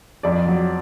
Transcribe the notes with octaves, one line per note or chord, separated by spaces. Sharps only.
F2 D5
F#3